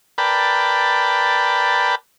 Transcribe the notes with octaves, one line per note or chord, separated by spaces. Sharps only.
A#4 B4 D5 G5 A5 B5